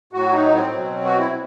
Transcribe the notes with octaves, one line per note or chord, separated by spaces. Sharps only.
A2 F#3 F#4
D#4
C4
B2 F#3
F#4
E4
B2